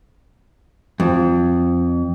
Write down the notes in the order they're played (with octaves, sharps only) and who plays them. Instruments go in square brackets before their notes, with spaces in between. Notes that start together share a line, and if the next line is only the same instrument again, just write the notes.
[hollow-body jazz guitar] F2